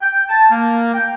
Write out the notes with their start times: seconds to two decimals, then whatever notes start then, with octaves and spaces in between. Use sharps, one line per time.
0.01 G5
0.29 A5
0.51 A#3
0.94 G5